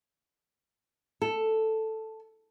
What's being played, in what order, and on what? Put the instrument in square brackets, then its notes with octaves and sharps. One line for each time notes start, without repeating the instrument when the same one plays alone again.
[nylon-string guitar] A4